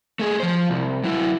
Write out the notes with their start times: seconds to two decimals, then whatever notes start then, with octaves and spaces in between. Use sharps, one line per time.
0.19 A3 G#4
0.40 F3 C5
0.70 C2
1.04 F#3 E4